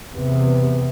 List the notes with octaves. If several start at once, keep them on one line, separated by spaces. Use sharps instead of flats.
E2 C3 B3